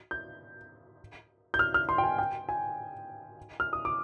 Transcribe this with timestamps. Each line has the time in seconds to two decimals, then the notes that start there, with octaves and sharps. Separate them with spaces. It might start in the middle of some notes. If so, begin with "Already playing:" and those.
0.11 G6
1.54 G6
1.59 F6
1.74 F6
1.89 C6
1.98 G5
2.04 G#5
2.19 G5
2.49 G#5
3.60 F6
3.73 D#6
3.85 D6